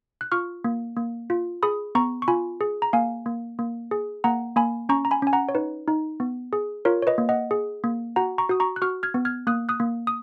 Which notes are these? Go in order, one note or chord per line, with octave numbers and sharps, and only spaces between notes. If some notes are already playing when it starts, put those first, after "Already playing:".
F#6
F4 C#6 F6
A#3
A#3
F4
G#4 B5 D#6
B3 A#5 C#6
C#6
F4 G#5 B5
G#4
A#5
A#3 F5 G#5
A#3
A#3
G#4
A#3 F#5 A#5
A#3 G#5 B5
C#4 A#5 C#6
A#5
G#5 B5
C#4 G#5
F#5 A#5
C#5
D#4 B4
D#4
B3
G#4
F4 A#4 C#5
C#5
B4 D#5
A#3
D#5 F#5
G#4
A#3
F#4 F#5 A#5
A#5 C#6
F#4 D#6
A#5 C#6
F#6
F#4 C#6 F6
F6 G#6
B3
F6 G#6
A#3 D#6 F#6
D#6 F#6
A#3
D#6